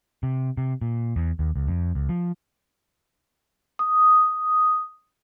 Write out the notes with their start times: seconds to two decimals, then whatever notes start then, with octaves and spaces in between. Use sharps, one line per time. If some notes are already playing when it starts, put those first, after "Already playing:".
0.23 C3
0.57 C3
0.82 A#2
1.16 E2
1.39 D#2
1.56 C#2
1.67 F2
1.95 C#2
2.09 F3
3.79 D#6